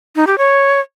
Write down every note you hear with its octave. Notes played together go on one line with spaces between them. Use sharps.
D#4
G4
C#5